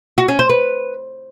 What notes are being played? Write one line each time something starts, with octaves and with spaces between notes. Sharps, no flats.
F#4
C#4
C5
B4